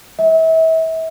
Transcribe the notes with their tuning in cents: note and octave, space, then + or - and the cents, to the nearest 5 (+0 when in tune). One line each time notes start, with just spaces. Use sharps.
E5 -35